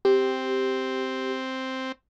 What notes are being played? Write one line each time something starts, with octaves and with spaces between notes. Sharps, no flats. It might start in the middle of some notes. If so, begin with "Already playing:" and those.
C4 G4